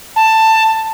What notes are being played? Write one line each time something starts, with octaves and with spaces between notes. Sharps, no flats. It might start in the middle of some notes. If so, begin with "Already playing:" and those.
A5